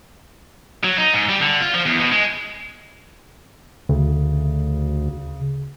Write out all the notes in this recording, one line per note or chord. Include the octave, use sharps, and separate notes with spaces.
F#3
D#4
G#2
G3
D3
F4
F3
E2
B2
G#3
D2 C#3